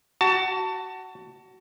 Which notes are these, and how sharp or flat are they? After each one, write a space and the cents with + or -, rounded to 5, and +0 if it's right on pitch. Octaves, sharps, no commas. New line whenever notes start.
F#4 +20 A5 +20